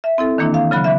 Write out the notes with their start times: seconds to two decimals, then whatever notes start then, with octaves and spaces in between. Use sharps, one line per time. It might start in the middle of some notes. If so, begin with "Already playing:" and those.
0.04 E5
0.18 C4 E4 A4
0.38 D#3 E3 A#3 D4 E4
0.54 F5
0.71 C#3 F#3 B5 F#6
0.84 E3 E5